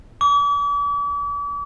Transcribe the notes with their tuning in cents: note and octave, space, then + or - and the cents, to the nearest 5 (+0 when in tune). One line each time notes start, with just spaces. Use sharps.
D6 -40